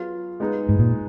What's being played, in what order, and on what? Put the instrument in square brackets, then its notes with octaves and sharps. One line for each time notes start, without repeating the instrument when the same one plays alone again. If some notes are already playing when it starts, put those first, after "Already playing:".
Already playing: [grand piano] F#3 B3 F4 G#4
G#3 B3 D#4 G#4
[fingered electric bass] G#2
A#2